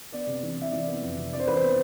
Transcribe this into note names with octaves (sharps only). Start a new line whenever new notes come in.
B3 D5
C3
E3
C3 E5
E3 D5
B3
F2
C3
C3 D5
C5
E3 B4
C5
B3